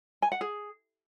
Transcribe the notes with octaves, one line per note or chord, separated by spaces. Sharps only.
G#5
F#5
G#4